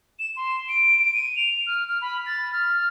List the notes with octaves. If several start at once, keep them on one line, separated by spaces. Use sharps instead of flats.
E7
C6
D7
D#7
F7
F6
F6
B5
A6
F6